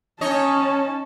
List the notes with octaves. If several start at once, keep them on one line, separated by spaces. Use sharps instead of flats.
C#4 D#4 C#5 D#5 A5